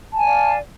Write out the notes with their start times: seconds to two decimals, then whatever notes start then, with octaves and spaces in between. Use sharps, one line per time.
0.12 A5
0.16 G#5
0.20 D5
0.24 F5